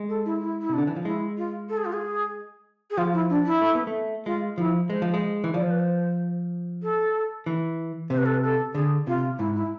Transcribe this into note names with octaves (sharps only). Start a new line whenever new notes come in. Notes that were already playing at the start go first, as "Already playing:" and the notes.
Already playing: G#3
A4
E4
E4
E4
C3 D4
D3
E3
F3
G#3 E4
F4
A4
G#4
F4
G#4
G#4
F3 F4
E4
D4
E4
A3
B3
A3
G#3 F4
F3 E4
G#3 C5
F3
G#3
E3
F3 D5
C5
B4
C5
A4
E3
C3 C5
B4
A4
B4
A4
D3 G#4
C3 F4
G#2 E4
E4